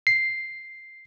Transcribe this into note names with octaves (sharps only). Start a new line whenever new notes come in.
C7